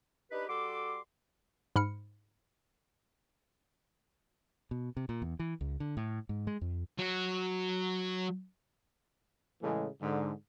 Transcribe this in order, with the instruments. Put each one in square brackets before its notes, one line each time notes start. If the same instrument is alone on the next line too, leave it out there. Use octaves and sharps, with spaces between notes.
[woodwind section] D4 D#4 G4 B4
G3 F#4 A4 C6 D6
[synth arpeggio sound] G#2 B5 F6 C#7
[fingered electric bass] B2
C3
A#2
E2
E3
C#2
D3
A2
G#2
G#3
F2
[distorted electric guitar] F#3 F#4
[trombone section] A2 C#3 E3 G#3 A3
G#2 D3